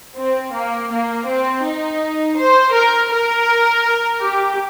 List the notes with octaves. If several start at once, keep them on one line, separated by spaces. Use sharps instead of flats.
C4
A#3
A#3
C4
D#4
C5
A#4
A#4
G4